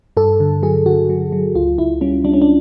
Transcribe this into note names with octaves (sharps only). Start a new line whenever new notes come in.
G2 A4
D3
F#3 G#4
D3 F#4
F#3
F#3
C#2 F4
C#2 E4
G3 C#4
G3 D4
C#4
D4